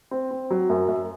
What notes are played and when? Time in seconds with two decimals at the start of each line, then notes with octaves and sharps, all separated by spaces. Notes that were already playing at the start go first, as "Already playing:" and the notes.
0.11 C4
0.31 C4
0.50 F#3
0.69 F#2
0.88 F#2